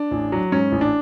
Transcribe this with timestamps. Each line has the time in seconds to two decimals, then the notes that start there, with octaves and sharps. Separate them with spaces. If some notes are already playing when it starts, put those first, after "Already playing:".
Already playing: D4
0.11 A1
0.32 F#3
0.52 G#2 C#4
0.72 A1
0.81 D4